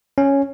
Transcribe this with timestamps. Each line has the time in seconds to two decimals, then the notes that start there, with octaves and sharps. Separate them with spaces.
0.18 C#4